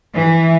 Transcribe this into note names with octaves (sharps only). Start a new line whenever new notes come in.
E3